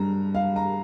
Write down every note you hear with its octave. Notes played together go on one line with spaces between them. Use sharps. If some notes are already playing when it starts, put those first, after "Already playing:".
Already playing: G2 G3 A#5
F5
A#5